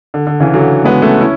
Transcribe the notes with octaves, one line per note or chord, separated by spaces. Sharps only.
D3
D3
C#3 E3
D3 F#3
G#3 B3
A3 C#4
C#4 E4